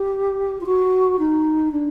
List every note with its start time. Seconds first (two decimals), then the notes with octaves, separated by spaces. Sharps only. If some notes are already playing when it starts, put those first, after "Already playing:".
Already playing: G4
0.61 F4
0.66 F#4
1.19 D#4
1.71 D4